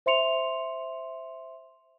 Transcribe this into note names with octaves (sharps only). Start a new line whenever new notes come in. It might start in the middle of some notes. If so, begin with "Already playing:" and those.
C5 E5 C6 C#7 F7